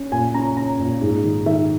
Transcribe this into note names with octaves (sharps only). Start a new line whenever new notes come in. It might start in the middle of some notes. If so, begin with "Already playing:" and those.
Already playing: C#4
A#2 G#5
C#4 A#5
C#4 A#5
A#2
G#2
D#3
D#3 E5